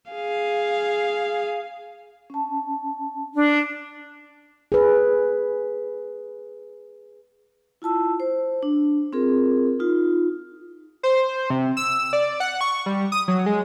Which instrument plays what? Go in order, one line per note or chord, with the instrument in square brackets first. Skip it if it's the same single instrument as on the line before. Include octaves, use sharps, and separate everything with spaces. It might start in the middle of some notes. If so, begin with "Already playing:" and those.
[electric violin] G#4 F5
[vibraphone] C#4 A5
[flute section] D4
[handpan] G#4 B4
[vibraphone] E4 F4 A5 E6
C5
D4
C4 F4 G#4 A#4
D#4 F4
[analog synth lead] C5
C3
E6
D5
F#5
C#6
G3
D#6
F#3
G#3